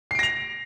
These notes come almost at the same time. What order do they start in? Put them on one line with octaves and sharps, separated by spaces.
C7 D7 A#6 F7